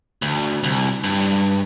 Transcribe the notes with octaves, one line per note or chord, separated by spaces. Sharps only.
D2
C2
G2